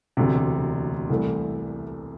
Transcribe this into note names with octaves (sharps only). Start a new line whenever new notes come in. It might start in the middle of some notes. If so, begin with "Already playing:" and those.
E1 D2 C3
C2 C3 E3 A3